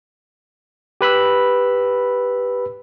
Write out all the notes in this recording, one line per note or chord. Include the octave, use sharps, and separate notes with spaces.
G4 B4 B5 E6